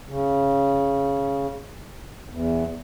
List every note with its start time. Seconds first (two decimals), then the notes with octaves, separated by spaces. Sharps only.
0.08 C#3
2.30 E2